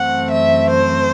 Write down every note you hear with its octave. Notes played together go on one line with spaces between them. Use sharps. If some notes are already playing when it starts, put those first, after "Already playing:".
Already playing: F#2 E3 A3 C4 F#5
E5
C5